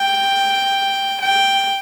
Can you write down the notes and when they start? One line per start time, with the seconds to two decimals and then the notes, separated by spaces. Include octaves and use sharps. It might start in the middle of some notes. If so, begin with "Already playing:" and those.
Already playing: G5
1.21 G5